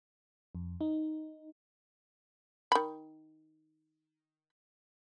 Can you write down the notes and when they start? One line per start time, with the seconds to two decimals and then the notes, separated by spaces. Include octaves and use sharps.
0.55 F2
0.81 D#4
2.72 D#3 B5